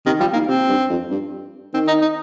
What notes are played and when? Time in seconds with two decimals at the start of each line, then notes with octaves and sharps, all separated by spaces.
0.06 C3 D#3
0.20 F3 G3
0.33 D#3 A#3
0.47 C3 C4
0.69 G2
0.90 F2
1.11 G2
1.74 D#3 C4
1.88 D#4
2.02 D#4